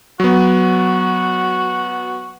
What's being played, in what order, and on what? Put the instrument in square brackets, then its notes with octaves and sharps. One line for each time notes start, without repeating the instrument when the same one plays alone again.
[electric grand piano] F#3 B3 [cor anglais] F#4